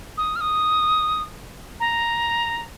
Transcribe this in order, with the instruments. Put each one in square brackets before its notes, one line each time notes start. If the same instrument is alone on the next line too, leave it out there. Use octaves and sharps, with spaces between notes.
[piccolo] D#6
F6
D#6
A#5